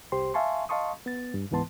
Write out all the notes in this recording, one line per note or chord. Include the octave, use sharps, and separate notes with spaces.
C2 G4 C5 C6
E5 F5 G#5 A5 C6 C#6
D#5 F5 A5 C6 C#6 D#6
B3 A6
G2
C#2 G#2 E3 B3 A5 C6